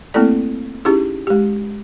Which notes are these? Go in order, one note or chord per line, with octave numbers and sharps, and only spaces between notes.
A3 A#3 C4 E4 A4 D5
C#4 D#4 E4 G4 G#4
G#3 G4